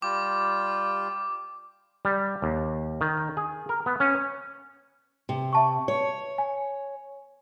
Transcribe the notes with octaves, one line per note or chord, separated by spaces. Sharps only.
G3 F4 G5 D6
G3
D#2
D#3
G#4
A#4
B3
C#4
C3
E5 A5 C#6
C#5
G#5